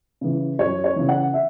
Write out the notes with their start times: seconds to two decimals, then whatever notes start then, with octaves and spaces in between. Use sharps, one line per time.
0.21 C#3 E3
0.59 F#2 C#5
0.84 C#5
0.96 C#3 E3
1.09 F#5
1.34 E5